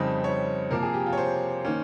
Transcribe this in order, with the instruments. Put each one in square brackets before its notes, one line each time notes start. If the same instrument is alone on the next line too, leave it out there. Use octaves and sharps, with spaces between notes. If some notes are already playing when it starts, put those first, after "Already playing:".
Already playing: [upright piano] F2 C#3 G3 C4 D#4 D#5
C#5
C3 F3 A#3 A#4
G#4
G4
F4
C#5
C5
D#3 A#3 C#4